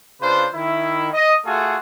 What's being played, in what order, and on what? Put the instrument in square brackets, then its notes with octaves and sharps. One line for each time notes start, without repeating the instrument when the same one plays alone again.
[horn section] C#3 D4 F4 B4 C5
D#3 E4
D#5
A3 F4 F#4 G#4 A4